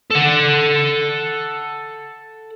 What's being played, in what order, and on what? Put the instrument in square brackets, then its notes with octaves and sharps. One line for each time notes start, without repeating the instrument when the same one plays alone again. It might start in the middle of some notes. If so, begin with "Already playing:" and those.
[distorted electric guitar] A4 F#5